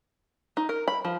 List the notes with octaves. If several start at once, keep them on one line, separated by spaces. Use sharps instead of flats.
D#4
A#4
B5
F3